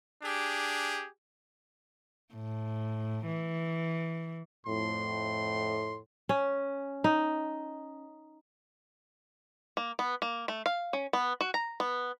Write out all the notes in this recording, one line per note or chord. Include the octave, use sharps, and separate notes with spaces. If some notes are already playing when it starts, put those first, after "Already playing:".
D4 G4 G#4
A2
E3
F2 A2 C6
C#4
D#4
A#3
B3
A#3
A3
F5
C#4
B3
F#4
A#5
B3